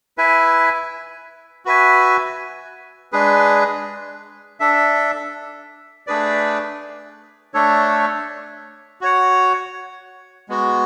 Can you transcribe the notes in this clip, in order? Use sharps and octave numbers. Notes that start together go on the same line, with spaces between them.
E4 B4 E5 G#5
F#4 B4 E5 G#5
G#3 D4 G#4 B4
D4 A4 E5
A3 D4 G#4 B4 D5
A3 D4 A4 C#5
F#4 C#5 F#5
G#3 B3 F#4